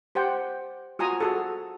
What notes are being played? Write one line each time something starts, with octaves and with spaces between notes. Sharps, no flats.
G4 C5 F#5 G5
F4 F#4 G#5 A#5 D#6
F#4 G#4 A4